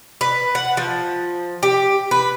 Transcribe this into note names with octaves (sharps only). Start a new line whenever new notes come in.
B4
F#5
F3
G4
B4